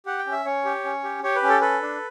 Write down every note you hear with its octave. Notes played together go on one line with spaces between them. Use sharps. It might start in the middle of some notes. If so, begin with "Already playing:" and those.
G4 F#5
G5
C#4
E5
C#4 C#5
G4
C#4
G4
G4 C#5
B4
C#4
A4
A4 B4
D4